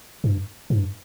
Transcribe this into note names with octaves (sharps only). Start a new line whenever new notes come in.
G2
G#2
G2